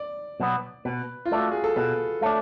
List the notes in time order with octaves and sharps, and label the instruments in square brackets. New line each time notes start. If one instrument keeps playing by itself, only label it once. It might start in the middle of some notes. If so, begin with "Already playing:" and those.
Already playing: [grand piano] D5
[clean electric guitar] B2 F#3 B3
[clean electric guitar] B2 [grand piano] B4
[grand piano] F4
[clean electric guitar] A3 D4
[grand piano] F#4
G#4
A4
[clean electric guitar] B2 [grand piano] B4
[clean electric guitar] A3 D4 [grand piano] C#5